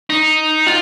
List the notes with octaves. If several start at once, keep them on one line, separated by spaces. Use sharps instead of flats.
D#4
F4